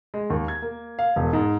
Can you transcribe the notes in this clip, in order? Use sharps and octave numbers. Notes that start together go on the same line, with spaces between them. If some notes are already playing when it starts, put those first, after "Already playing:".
G#3
D#2
G#6
A#3
F5
E1
G#2